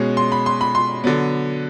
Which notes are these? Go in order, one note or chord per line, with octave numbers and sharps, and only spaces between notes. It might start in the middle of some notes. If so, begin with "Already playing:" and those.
Already playing: B2 G#3 C#4
C6
B5
C6
B5
C6
D3 F#3 B3